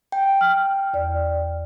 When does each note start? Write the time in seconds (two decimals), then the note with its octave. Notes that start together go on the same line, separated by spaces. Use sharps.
0.12 G5
0.41 F6
0.94 E2 D5